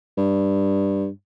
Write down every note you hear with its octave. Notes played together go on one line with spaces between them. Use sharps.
G2